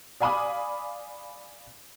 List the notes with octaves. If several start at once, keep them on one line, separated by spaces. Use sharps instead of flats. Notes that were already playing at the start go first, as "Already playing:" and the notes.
D5 F5 G#5 B5 D6 D#6